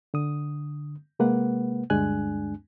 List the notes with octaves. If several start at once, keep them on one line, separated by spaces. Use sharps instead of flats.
D3 D#6
C3 G#3 A#3 B4 F#5
D2 G2 G#3 D4 G#5 F#6